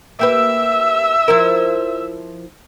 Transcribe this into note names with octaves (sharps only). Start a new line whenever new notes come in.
A#3 G4 B4 E5 E6
F3 E4 A#4